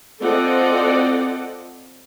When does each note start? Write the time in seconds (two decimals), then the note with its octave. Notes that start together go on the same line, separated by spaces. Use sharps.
0.20 C4 F4 A4 D5 D#5 F#5